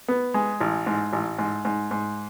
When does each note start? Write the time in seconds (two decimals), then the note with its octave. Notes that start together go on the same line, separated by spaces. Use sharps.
0.08 B3
0.34 G#3
0.60 A1
0.87 G#2
1.13 A1
1.39 G#2
1.65 G#2
1.91 G#2